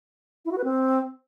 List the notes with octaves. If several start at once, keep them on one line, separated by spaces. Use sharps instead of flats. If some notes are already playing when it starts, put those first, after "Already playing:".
E4
F#4
B4
C4